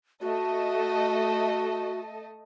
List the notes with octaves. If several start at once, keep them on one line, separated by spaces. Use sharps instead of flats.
A3 F#4 A4 D#5